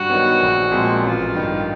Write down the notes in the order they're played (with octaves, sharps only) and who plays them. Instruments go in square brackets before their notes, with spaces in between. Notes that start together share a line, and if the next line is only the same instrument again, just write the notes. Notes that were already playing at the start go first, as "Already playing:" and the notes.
Already playing: [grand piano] G2 [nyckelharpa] F#4
[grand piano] D#3 F#3 B3
A#1
A#2 F3 G#3 C4
[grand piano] A1 [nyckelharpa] F4
[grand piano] G2 D#3